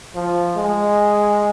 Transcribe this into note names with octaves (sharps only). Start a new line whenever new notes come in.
F3
G#3